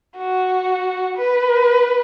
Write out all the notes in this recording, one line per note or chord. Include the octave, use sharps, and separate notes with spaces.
F#4
B4